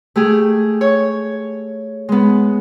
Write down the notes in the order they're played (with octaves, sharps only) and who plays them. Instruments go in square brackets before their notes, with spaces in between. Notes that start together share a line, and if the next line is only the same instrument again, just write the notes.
[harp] A3 G4 G#4
C#5
G#3 B3